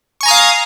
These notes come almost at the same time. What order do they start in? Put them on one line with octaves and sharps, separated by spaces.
C#6 G#5 A#5 D#6 F5